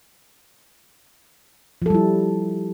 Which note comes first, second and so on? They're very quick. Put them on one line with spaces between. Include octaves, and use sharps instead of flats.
F3 A4 G3 E4